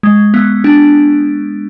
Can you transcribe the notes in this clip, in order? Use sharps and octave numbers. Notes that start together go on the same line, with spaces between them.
G#3
B3
D4